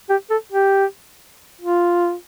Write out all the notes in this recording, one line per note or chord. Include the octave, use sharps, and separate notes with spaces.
G4
A4
G4
F4